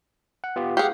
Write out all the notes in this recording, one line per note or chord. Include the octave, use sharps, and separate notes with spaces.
F#5
B3 F4 G4
G4 G#4 F5 F#5